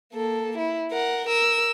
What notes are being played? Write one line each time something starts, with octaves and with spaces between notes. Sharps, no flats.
A#3 A4
E4
A#4 F#5
A#4 E6